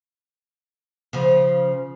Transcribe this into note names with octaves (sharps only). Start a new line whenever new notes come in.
C#3 F3